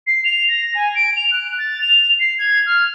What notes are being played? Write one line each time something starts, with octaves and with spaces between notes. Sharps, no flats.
C7
F7
A#6
G#5
D7
F7
F#6
A6
F7
C7
G#6
F6